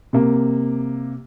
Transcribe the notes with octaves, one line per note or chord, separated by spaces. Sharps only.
C3 A#3